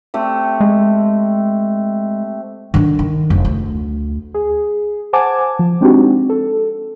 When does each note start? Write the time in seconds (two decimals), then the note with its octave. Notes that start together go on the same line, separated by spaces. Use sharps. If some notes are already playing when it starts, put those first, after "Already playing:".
0.14 A3 C4 G4
0.60 G#3
2.74 D3 D#3
2.99 D#3
3.30 F1
3.45 D2
4.34 G#4
5.13 C5 F#5 G#5 A5 D6 G#6
5.59 F3
5.81 G#3 C4 D4 D#4 F#4 G4
6.29 A4